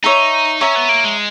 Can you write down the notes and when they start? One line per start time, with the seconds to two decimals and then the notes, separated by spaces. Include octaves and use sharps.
0.04 D#4 C#5 E5 A#5
0.61 C#4 C#5 E5 A#5
0.76 B3
0.89 A#3
1.04 G#3